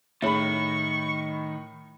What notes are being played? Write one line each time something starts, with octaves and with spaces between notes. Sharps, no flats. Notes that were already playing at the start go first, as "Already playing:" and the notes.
A2 D#3 G#4 C#5 E5 B5 C#6